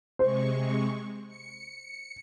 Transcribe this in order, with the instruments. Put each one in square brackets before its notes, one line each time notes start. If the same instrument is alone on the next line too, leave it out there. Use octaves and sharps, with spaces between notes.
[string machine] C3 G#3 C#6 [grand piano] C5
[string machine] C#7